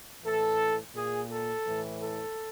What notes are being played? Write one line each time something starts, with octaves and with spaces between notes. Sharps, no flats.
A2 E3 A4
A#2 G#4
A4
A2 E3
A4